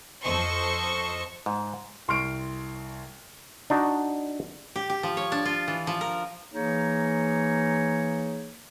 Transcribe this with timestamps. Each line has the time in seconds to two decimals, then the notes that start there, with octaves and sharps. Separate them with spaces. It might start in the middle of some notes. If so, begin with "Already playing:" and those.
0.23 F2 A4 C5 D#5 C#6
1.46 G#2
2.08 C2 C6 C#6 F6 C7 D7
3.70 D4 D#4 F#4 D#5
4.76 G4
4.90 G4
5.03 F3
5.17 C#5
5.32 D4
5.45 F4
5.68 E3
5.87 F3
6.01 A#4
6.53 E3 A#3 D#4 G#4 C#5